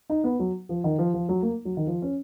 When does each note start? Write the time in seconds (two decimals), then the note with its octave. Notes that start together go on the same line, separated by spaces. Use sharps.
0.10 D#4
0.24 B3
0.39 F#3
0.69 F3
0.84 D#3
0.99 F3
1.14 F3
1.29 F#3
1.42 A#3
1.65 F#3
1.77 D#3
1.87 F3
2.02 C#4